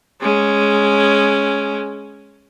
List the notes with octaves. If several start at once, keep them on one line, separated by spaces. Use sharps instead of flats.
G#3 C#4